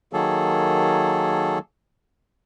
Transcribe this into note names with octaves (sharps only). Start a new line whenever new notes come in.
D#3 F#3 A#3 G#4 A4